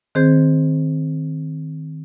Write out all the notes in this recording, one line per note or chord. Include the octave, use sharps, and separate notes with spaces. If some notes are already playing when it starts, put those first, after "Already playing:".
D#3 C4 G#4 C5 G6